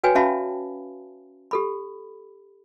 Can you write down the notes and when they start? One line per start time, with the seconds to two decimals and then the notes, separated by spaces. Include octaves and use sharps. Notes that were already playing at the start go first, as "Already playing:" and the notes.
0.04 F#4 B4 C#5 G5 G#5
0.15 C#4 F#4 E5 F5 A5 B5
1.51 G4 A4 B5